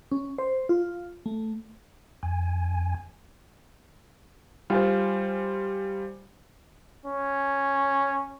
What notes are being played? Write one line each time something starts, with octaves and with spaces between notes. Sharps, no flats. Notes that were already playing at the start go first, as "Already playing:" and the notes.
C#4
C5
F4
A3
F2 G#5
G3 F4 C5 G#5
C#4